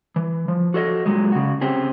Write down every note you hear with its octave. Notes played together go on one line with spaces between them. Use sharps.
E3
F3
F#4 A4 C#5 D#5
A#2 F#3 G#3
C#3 F#4
C4 C#4 G4 G#4